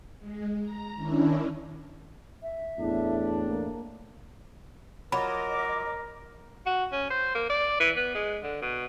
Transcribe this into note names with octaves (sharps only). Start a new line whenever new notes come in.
G#3
A#5
D#3 C#4 D4 E4
E5
E2 A2 D4
A#3
F#3 F4 A#4 D#5 B5 D6
F#4
C#4
C5
A#3
D5
E3
B3
G#3
D3
B2